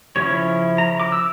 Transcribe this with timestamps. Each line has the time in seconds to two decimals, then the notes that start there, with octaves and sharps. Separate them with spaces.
0.16 C#3 F3 C#4 E4 C#5
0.78 A#5
1.00 D6
1.12 E6